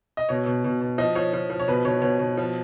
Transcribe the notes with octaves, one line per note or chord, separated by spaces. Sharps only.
D#5
B2 C#5
B2
B2
B2
F3 D#5
F3 C#5
F3
F3
C#5
B2 B4
B2 C#5
B2 C#5
B2
F3